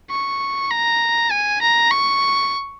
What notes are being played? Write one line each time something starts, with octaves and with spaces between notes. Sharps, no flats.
C#6
A#5
G#5
A#5
C#6